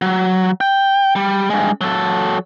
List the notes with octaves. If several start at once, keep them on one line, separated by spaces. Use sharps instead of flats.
F#3
G5
G3
G2 G#3
F#3 A4